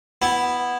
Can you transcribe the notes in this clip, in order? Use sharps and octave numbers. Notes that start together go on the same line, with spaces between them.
B3 E4